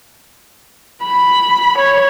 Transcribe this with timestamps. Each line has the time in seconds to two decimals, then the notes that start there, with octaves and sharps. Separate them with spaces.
1.03 B5
1.78 C#5